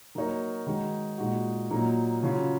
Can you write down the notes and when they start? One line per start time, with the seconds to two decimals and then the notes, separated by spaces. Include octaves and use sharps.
0.15 F#3 A#3 D#4 A#4 C#5
0.67 D#3 G#3 D#4 F#4
1.18 A#2 G#3 D#4 F#4
1.70 A#2 F#3 A#3 D#4 A#4
2.22 C#3 F#3 C#4 F4